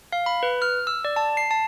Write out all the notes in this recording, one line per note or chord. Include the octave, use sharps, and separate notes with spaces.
F5
B5
B4
F6
E6
D5
A5
C7
A5